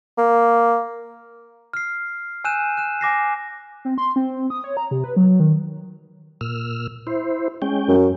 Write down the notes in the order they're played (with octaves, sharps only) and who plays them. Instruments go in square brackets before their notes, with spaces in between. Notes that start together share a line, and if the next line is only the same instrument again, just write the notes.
[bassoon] A#3
[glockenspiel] F6 C7
G#5 E6 F#6 G6 D#7 E7
F#6 E7
G#5 D6 A#6 C7
[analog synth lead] C4
C6
C4
D#6
C#5
A#5
C3
B4
F#3
D#3
[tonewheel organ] A#2 E6 F6
E4 C5
G#3 C#4 G5
[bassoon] F#2